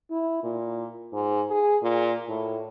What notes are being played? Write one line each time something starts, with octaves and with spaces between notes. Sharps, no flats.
E4
A#2
G#2
G#4
A#2
A2